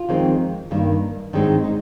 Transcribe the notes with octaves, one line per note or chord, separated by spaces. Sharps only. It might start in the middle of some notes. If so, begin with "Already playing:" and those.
Already playing: F4
F2 D#3 G#3 C4
G2 D#3 A#3
G#2 D#3 G#3 C4 D4
D#4